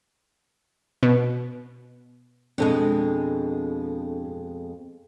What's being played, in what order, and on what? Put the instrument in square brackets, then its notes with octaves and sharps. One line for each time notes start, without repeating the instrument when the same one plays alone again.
[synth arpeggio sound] B2
[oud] F2 B2 G#3 [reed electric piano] C4 D4 A4